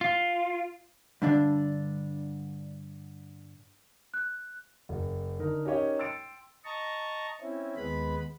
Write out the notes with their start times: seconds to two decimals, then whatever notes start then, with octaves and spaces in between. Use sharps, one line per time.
0.01 F4
1.22 G2 D3 D4
4.14 F#6
4.89 F#1
5.39 D3 D#4 A#4
5.65 C#4 D#4 G4 A#4 C#5 D#5
5.98 G5 C6 E6 A6 C#7 D7
6.65 D#5 A5 A#5 C#6
7.41 C4 C#4 E4
7.77 D#2 G#3 B3 B4 B5